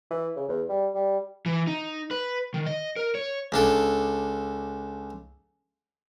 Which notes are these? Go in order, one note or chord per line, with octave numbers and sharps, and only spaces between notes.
E3
C#3
E2
G3
G3
E3
D#4
B4
D#3
D#5
A#4
C#5
C#2 D4 A4